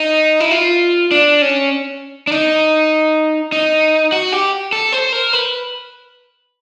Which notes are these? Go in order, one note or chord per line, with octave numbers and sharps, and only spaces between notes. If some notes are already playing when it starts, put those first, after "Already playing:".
Already playing: D#4
E4
F4
D4
C#4
D4
D#4
D#4
F#4
G4
A4
C5
A#4
B4